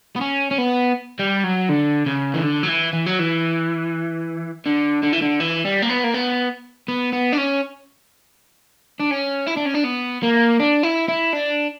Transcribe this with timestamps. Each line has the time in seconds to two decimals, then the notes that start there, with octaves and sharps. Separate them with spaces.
0.16 B3
0.21 C#4
0.51 C#4
0.58 B3
1.19 G3
1.44 F#3
1.69 D3
2.06 C#3
2.34 E3
2.43 D3
2.63 F#3
2.68 E3
2.93 E3
3.06 F#3
3.20 E3
4.66 D3
5.03 D3
5.12 E3
5.22 D3
5.40 E3
5.65 G3
5.82 A#3
5.89 B3
6.04 A#3
6.14 B3
6.88 B3
7.13 B3
7.33 D4
7.38 C#4
9.00 D4
9.11 C#4
9.47 E4
9.57 D4
9.66 C#4
9.75 D4
9.84 B3
10.23 A#3
10.60 D4
10.83 E4
11.09 E4
11.33 D4